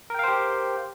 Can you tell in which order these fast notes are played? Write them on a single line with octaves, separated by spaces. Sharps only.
A#4 G5 F5 C5 G4